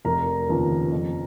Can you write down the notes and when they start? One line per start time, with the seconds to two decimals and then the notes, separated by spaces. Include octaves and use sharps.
0.05 F1 A#4 A#5
0.49 D#2 C#3 F3 B3
0.92 F2